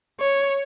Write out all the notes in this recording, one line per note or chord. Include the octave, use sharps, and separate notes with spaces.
C#5